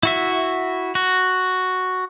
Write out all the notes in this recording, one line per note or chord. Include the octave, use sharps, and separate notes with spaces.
E4 F#4 E5
F#4